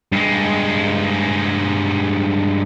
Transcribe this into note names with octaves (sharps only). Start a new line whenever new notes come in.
G2 G#3